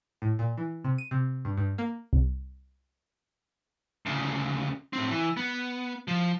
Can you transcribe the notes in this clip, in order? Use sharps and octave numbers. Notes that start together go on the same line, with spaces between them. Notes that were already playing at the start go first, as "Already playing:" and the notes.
A2
A#2
E3
C3
D#7
C3
G2
G2
A#3
C2
D2 C#3
A2 C4
E3
B3
F3